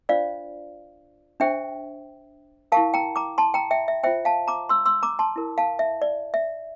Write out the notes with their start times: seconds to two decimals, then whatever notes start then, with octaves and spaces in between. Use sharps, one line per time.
0.09 D4 F4 C5 D5 F5
1.40 D4 G4 C5 E5 G5
2.72 E4 G4 A#4 F5 A5
2.94 G5 A#5
3.16 A#5 D6
3.38 A5 C6
3.54 G5 A#5
3.71 E5 G5
3.88 E5
4.04 F4 C5 E5 G5
4.25 F5 A5
4.48 A#5 D6
4.69 C6 E6
4.86 C6 E6
5.03 A#5 D6
5.19 A5 C6
5.36 E4 A#4
5.58 F5 A5
5.79 E5
6.02 D5
6.34 E5